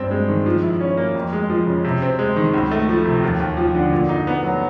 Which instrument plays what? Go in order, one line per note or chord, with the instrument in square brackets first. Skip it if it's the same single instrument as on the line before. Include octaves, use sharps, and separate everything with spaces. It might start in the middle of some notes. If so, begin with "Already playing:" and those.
Already playing: [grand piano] G2 C4
G#3
D#3
F3
E4
C#4
A#3
F2
G#3
F3
C#3
C3
C4
G#3
D#3
C#2
A3
F3
C3
D#2
D#2
F3
D3
A#2
D#4
B3
F#3